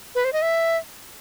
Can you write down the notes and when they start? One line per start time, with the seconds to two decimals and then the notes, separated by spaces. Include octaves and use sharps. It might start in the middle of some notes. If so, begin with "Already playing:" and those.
0.15 B4
0.25 C5
0.33 D#5
0.42 E5